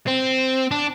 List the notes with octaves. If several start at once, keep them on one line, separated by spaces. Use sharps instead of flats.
C4
D4